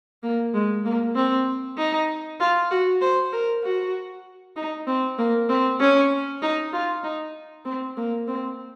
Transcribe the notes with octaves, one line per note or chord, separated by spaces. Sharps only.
A#3
G#3
A#3
C4
D#4
F4
F#4
C5
A#4
F#4
D#4
C4
A#3
C4
C#4
D#4
F4
D#4
C4
A#3
C4